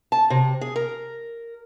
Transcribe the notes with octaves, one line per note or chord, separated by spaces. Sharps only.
A5
C3
G#4
A#4